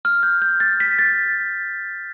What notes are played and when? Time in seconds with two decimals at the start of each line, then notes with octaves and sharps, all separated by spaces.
0.05 F6
0.23 G6
0.42 G6
0.60 A6
0.80 B6
0.99 A6